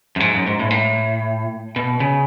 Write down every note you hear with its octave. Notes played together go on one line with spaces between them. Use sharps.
F#2
G#2
F#2
G#2
A2
G#2
A2
B2
C#3